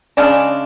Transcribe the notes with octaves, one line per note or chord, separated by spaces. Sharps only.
C#3 G#3 D4